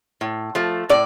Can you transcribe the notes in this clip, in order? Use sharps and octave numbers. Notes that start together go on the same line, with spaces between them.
A2
F3 A3
A2 D5